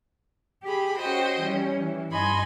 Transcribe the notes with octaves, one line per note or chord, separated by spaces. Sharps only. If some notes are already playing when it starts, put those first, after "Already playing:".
G4 G#4 B5
C#4 F#4 C5 D#5 G5
E3 G3 C#4
E3
G2 D#4 D#5 G#5 B5 C6